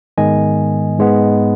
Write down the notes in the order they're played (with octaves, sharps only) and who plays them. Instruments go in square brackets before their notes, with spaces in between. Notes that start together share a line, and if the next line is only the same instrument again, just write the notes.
[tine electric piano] G#2 D#3 G#3 B3 D#5 G#5
G#2 G#3 B3